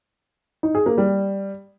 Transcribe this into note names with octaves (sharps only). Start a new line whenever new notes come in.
D#4
G#4
A#3
G3